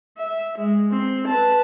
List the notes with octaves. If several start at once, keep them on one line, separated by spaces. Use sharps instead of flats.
E5
G#3
C4
B4 A5